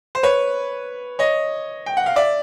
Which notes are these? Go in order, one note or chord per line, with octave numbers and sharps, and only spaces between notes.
C5
B4 C#5
C#5 D#5
G5
F#5
F5
D5 E5